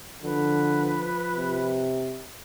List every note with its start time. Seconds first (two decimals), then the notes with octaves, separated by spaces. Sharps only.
0.23 D3 F3 B4
1.36 C3